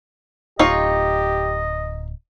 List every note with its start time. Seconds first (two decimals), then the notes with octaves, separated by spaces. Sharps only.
0.59 D1 D#4 F4 G4 C#5 D#5